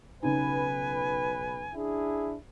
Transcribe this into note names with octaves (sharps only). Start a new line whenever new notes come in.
B1 C#3 D#4 B4 G#5
D4 E4 G#4